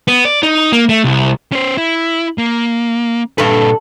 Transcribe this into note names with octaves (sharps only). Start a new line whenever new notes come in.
B3
D5
D#4
A#3
A3
C2
C#4 C5
E4
A#3
G2 A#2 A4 B4